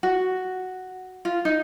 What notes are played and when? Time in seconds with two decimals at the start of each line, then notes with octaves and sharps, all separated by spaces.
0.03 F#4
1.25 F4
1.45 D#4